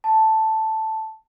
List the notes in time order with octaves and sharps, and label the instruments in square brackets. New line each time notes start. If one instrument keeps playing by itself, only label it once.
[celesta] A5